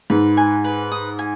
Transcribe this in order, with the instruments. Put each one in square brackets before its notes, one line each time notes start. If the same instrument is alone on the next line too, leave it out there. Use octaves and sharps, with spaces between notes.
[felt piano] G#2 [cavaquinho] B4
[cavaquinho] G#5
B4
D#6
G#5